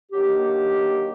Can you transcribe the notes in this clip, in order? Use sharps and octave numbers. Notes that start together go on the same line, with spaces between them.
D#3 F#3 A#3 D4 G4